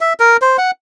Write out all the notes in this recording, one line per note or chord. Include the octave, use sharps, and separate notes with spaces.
E5
A#4
C5
F#5